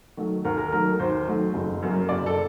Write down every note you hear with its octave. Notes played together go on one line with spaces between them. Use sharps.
D#3 F#3 A3
D#2 A#4
A#4
D#3 F#3 A3 A#4
D#2 C5
D#3 F#3 A3
F#1
F#2 F#3 A#3
F#1 D5
A4